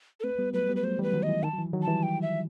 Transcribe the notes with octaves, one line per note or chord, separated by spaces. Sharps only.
A4
A3 C4 B4
G3 B3
F#3 A3 B4
G3 B3
B4
F#3 A3 C5
E3 G3
B4
D#3 F#3
D#5
E3
D#3 A5
F#3
E3
D#3 F#3
A5
E3 G3
G5
E5